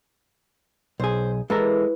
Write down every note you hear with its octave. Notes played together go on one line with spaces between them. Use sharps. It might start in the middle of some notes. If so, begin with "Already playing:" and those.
B1 G#4 C5
E3 G#3 A4 A#4